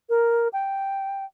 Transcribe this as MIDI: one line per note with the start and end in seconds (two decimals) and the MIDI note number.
0.09 0.48 70
0.53 1.24 79